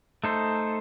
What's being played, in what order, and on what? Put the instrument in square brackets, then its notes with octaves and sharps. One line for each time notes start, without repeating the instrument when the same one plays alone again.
[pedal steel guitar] A3 D#4 A4 C5